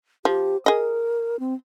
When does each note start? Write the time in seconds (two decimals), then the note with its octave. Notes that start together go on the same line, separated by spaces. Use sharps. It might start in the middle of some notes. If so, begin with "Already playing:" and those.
0.25 F3 G4
0.66 G#4 A#4 D#5
1.40 C4